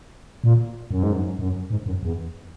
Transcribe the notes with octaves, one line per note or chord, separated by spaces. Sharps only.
A#2
F#2
G#2
F#2
F#2
G#2
F#2
E2